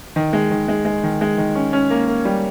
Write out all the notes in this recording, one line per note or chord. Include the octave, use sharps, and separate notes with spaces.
D#3
G#3
D#3
G#3
G#3
D#3
G#3
D#3
C#4
C#4
A#3
A#3
G3